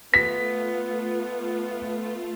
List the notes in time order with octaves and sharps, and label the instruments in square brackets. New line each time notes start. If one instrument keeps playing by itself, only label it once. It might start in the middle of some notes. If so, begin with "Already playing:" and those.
[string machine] A3 F4 [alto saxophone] B3 [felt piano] B6